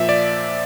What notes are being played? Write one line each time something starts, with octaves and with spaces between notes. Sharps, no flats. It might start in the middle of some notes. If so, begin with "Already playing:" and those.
Already playing: A#2 F3 E5
D5